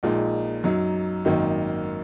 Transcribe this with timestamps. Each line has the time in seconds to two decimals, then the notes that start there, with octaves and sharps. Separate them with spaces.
0.03 A#1 A#2 G#3 D#4
0.64 F#2 F#3 D#4
1.25 G#1 F#2 D#3 A#3 D#4